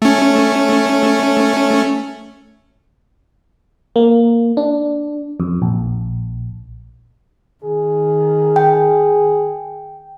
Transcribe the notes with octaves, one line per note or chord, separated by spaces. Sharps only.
A3 C#4
A#3
D4
F2
A#1
D#3 G#4
G5